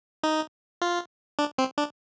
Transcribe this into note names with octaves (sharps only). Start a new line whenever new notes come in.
D#4
F4
D4
C4
D4